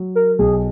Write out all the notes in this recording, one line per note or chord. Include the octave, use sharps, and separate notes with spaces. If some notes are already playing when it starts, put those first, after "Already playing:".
Already playing: F#3
A#4
B1 G#4